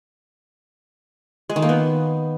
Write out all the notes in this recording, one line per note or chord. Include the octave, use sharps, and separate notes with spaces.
G#3
D#3
A#3
B3